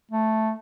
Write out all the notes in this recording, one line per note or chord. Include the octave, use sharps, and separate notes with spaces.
A3